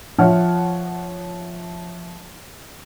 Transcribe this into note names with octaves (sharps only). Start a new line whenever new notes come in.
F3 C#5 E5 F#5 F6